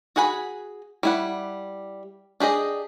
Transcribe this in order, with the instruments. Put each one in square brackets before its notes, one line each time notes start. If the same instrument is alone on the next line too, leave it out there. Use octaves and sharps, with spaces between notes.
[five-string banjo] F#4 G#4 F#5 G#5 B5
G3 E4 F#5
D4 G4 G#4 D#5